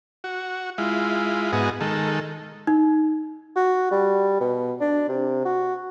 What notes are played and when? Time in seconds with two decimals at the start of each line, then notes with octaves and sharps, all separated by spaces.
0.24 F#4
0.78 G#3 E4 F4
1.53 G#2 B3 F#4 G#4 D#5
1.81 D#3 G#3 A4
2.67 D#4
3.56 F#4
3.91 G3
4.40 B2
4.81 D4
5.08 C3
5.45 F#4